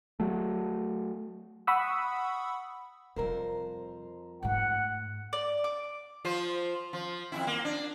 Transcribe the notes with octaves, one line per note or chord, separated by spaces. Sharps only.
F#3 A3
F#5 B5 C#6 D#6 E6
F2 C3 G3 A#4 C5
G#2 A3 F#5
D5
D6
F3 F4 C5
F3
F2 B2 E4
A#3
D4